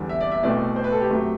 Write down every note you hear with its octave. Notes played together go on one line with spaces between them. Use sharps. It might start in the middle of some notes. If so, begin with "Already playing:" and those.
Already playing: E2 D3 G3
E5
D5
E5
C2 B2 A3 C4 D5
C5
B4
A4
G4
F#2 F#3 A3 C4